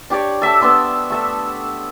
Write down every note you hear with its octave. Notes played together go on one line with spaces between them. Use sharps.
D4 G4 C#5 D5
A4 E5 A5 E6
B3 D4 C6 E6
A3 A4 E5